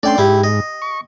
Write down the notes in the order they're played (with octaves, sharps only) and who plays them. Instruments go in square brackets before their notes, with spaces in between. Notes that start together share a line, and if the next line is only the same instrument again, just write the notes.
[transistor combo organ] A3 C#4 D4 [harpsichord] D5 G5 C6
[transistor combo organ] G#2 [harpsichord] E4 G4
[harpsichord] D#5
[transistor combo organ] C#6